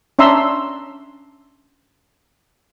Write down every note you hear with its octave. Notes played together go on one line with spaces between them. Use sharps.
C#4 D4 E5 A#5 C6 E6